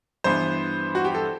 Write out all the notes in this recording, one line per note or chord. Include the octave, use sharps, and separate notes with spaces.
G2 E3 B3 C5
F#4
G4
A4